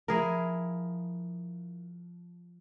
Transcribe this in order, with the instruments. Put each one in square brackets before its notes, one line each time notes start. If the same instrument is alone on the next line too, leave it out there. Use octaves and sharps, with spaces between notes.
[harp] F3 [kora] E4 G#4 A#4